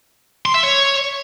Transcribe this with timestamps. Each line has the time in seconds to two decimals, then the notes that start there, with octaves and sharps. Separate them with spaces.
0.45 C6
0.54 E5
0.63 C#5